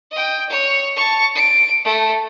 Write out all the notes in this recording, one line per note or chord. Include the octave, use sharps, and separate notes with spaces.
D#5 G5
C#5
A5 C#6
D7
A3